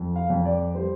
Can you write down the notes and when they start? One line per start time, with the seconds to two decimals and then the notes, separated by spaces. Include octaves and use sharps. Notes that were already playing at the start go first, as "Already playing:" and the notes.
Already playing: F2
0.16 F5
0.30 F2
0.45 D5
0.74 G3 C5